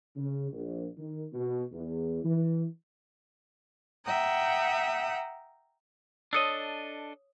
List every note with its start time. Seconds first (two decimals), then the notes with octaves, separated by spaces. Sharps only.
0.16 C#3
0.52 A#1
0.98 D#3
1.33 B2
1.72 E2
2.24 E3
4.05 E5 F#5 G5 A#5 D#6
6.33 D4 A4 C#5 D#5 D#6 E6